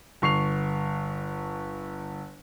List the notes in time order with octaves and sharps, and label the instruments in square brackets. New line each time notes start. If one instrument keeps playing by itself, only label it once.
[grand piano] G1 C#6 C7 F7